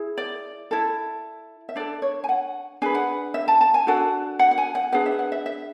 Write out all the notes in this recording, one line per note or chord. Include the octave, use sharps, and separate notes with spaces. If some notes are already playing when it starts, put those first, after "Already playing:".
Already playing: E4 G#4
D5
E4 A4
E5
D4 A4 D5
C#5
G#5
F#5
D4 G#4 B4 G#5
F#5
E5
A5
A5
G#5
D4 F#4 A4 F#5
F#5
F#5
G#5
F#5
D4 G#4 B4 F#5
E5
F#5
E5
E5